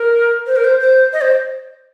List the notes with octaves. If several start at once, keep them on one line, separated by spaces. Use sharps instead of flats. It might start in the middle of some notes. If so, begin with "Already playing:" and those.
Already playing: A#4
C5
A#4
C5
C5
D#5
C5